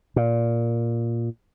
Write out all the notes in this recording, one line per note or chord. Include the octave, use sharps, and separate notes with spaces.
A#2